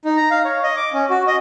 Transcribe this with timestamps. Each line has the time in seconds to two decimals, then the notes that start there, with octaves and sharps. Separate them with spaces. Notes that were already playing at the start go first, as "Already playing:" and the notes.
0.05 D#4
0.17 A#5
0.31 F5
0.45 C#5
0.64 D#5
0.76 D6
0.93 C#4
1.10 F#4
1.27 D#5